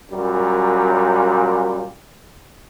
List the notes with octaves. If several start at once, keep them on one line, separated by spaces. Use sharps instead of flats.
F#2 A#2 G3